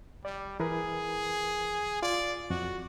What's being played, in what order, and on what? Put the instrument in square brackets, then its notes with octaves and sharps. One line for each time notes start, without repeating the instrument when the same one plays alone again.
[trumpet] G3 [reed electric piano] D5
[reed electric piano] E3 A#4 B4 [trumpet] G#4
[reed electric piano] F4 [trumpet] D5
[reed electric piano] F2 [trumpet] F#4